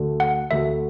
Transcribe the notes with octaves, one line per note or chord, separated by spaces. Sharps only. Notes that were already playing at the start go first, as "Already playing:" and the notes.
Already playing: D2 D3 A3 F#4
F#5
D2 D3 A3 F#4 E5